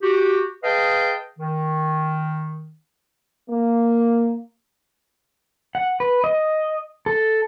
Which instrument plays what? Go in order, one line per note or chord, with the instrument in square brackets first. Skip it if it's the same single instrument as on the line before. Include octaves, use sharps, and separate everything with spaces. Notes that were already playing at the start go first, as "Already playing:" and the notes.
[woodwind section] F#4 G4
G#4 B4 D#5 F5 G5 A5
D#3
[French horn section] A#3
[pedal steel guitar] F#5
B4
D#5
A4